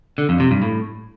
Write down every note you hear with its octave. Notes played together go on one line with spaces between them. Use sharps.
D3
F2
C3
G2
A2